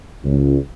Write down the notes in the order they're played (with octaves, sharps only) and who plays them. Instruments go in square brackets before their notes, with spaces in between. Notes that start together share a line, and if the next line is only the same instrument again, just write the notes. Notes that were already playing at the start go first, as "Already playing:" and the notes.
[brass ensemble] C#2